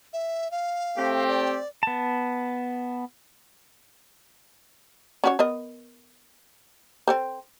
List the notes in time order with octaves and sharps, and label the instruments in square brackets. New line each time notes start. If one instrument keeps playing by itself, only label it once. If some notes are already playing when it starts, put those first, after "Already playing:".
[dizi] E5
F5
[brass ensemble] A3 C4 G4
[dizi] D5
[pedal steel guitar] B3 A5
[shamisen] C#4 F#4 C#5
B3 A#4 D#5
C4 A4 C5